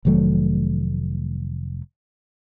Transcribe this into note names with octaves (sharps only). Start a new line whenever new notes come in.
F1 D#3 F#3 A3